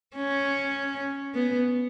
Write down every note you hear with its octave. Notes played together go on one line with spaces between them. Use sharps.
C#4
B3